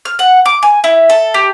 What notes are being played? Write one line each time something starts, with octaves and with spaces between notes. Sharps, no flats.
F6
F#5
D6
G#5
E4
A4
G4